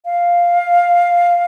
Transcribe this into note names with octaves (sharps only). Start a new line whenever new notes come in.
F5